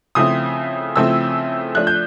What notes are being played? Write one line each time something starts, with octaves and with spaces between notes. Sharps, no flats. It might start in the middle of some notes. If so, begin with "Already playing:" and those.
C#3 F3 A3 C4 E4 D#6
C#3 F3 A3 C4 E4 E6
F3 A3 D4 F#6
G6